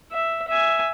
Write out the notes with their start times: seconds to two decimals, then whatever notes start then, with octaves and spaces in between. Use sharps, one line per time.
0.12 E5
0.48 E5 G#5